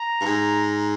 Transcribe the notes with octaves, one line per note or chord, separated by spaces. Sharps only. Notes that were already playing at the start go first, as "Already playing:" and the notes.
Already playing: A#5
G2
G#2